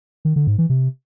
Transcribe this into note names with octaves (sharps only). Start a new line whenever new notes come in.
D#3
D3
G#2
E3
C3